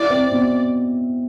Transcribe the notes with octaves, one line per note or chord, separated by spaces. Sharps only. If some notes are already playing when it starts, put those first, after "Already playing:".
Already playing: E4 D5
C4
B2